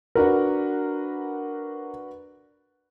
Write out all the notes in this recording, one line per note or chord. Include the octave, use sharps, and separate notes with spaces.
D4 F#4 A#4 B4 F#5